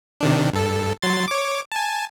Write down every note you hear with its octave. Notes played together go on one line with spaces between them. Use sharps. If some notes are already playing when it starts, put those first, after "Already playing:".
C3 D#3 D4
G2 A4
F#3 C6 A6
C#5 D6
G#5 A5